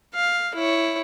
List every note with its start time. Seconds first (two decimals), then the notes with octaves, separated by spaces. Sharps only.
0.15 F5
0.55 E4 C#5